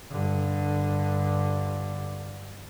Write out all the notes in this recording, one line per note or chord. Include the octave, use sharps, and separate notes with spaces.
G2 D3